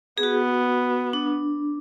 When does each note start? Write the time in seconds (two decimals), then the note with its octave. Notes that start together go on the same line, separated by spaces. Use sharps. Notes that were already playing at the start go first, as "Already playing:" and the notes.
0.18 G#4
0.23 B3 F#4
1.13 D4